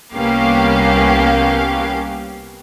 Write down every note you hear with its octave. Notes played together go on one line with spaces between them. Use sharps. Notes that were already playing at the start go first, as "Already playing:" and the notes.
C2 A#3 B3 C#4 G4 F5